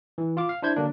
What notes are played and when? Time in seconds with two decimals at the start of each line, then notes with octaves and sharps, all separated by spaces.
0.18 E3
0.37 F4 F5 D6
0.49 F5
0.62 D4 E4 C5 G6 G#6
0.76 D3 F#3 A#3 D4